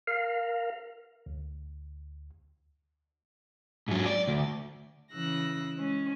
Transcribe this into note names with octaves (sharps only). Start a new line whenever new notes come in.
A#4 F5
D2
G#2 F#3
D5
D2
C#3 E3 E6 F#6 A#6
G#3 C#4